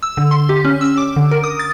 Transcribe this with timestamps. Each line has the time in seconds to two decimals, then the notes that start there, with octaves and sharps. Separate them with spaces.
0.03 E6
0.17 D3
0.31 C6
0.49 G4
0.65 C#4
0.81 E6
0.98 D6
1.16 D3
1.31 A#4
1.44 D#6
1.59 A6